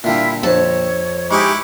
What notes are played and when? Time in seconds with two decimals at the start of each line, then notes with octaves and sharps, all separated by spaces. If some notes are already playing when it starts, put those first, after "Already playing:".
0.04 A#2 D3 G3 E4 F4 E5
0.43 F2 C#5 A5
1.31 G#3 D#4 E4 G4 G#5 C#6 D6